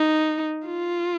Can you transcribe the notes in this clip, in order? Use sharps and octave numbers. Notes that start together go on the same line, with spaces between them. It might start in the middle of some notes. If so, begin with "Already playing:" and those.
Already playing: D#4
F4